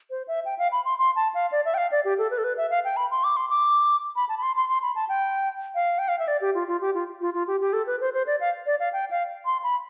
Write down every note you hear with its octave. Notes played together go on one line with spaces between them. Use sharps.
C5
E5
G5
F5
B5
C6
C6
A5
F5
D5
E5
G5
F5
D5
G4
A4
B4
A4
B4
E5
F5
G5
B5
C6
D6
C6
D6
B5
A5
B5
C6
C6
C6
B5
A5
G5
F5
G5
F5
E5
D5
G4
F4
F4
G4
F4
F4
F4
G4
G4
A4
B4
C5
C5
D5
F5
D5
F5
G5
F5
C6
B5